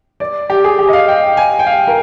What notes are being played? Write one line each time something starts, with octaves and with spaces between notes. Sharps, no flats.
D5
G4
G#4
G4
D#5
F5
G5
G#5
G5
F5
A#4